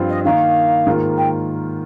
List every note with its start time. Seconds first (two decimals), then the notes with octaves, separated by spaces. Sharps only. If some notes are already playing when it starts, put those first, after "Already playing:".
Already playing: G2 F3 C4 F4
0.09 D#5
0.25 D#3 A#3 D#4 F5
0.87 G#2 D#3 A#3 F4
1.18 G5